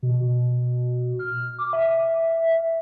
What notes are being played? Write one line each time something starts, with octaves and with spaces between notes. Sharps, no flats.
B2
F6
D6
E5